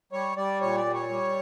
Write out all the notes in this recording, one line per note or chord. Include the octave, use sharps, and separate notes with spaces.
G3 C#5
G3 D5
A#2 C#5
D5
G3
C#5
G3